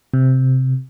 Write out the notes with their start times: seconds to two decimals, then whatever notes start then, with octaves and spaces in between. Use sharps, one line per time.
0.14 C3